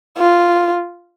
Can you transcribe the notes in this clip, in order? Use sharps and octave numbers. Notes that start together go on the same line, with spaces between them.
F4